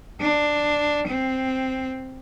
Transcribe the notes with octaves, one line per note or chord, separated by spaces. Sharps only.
D4
C4